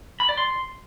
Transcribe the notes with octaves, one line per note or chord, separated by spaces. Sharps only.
B5
D5
C6